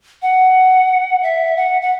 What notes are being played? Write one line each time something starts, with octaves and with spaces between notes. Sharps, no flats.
F#5
E5
F#5
F#5